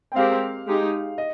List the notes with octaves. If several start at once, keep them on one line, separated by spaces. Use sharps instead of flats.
G5
G#3 C4 G4 A#4 F5
G#3 D#4 G4
D#5